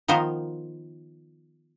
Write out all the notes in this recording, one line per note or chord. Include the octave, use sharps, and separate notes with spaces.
D#3 F3 B3 A#4 C5